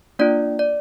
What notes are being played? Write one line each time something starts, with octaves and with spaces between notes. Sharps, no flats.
A#3 D4 F4 D5
D5